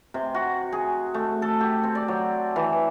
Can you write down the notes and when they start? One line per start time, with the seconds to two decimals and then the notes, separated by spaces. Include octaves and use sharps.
0.14 C3
0.34 F#4
0.72 G#4
1.14 A3
1.42 A4
1.61 G4
1.83 C4
1.95 D5
2.08 F#3
2.56 E3